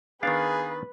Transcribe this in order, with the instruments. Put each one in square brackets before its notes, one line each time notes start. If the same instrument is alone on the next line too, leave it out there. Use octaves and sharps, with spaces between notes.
[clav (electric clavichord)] D#3 B3 D4 [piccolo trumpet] G#4 [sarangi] B4 [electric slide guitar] F5